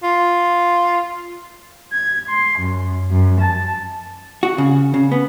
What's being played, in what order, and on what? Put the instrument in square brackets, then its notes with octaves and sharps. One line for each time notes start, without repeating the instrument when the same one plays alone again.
[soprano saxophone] F4
[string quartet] G#6
C6
F#2
F#2
A5
[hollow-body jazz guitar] F#4
C#3
C#3
B3